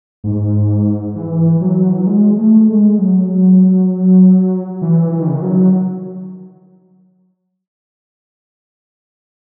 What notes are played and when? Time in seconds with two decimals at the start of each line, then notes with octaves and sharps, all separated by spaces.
0.24 G#2
1.15 E3
1.61 F#3
1.92 E3
1.99 F#3
2.07 G#3
2.38 A3
2.68 G#3
2.98 F#3
4.82 E3
5.12 E3
5.20 D#3
5.27 C#3
5.35 D#3
5.42 F#3